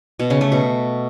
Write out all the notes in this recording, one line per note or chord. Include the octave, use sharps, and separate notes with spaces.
B2
C#3
A3
B2